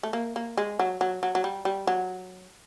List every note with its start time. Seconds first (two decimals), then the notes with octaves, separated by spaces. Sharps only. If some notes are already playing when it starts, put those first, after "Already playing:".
0.03 A3
0.13 A#3
0.36 A#3
0.57 G#3
0.79 F#3
1.01 F#3
1.23 F#3
1.35 F#3
1.44 G3
1.65 G3
1.87 F#3